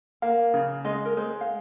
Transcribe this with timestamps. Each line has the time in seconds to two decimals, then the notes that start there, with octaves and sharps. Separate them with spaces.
0.22 A#3 F5
0.54 C#3
0.85 G#3 D#5
1.05 A#4
1.17 G#3 C5
1.41 F5